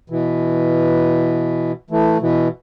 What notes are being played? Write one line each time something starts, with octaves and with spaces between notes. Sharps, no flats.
B2 E3
E3 A3
B2 E3